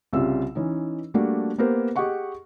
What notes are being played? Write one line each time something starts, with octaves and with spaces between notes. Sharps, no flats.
C2 C#3 G3 F4 E5 E6
E3 C#4 D#4
G3 A3 A#3 D4 F#4
A#3 B3 G4 A#4 C5
G4 G#4 D#5 F#5 C#6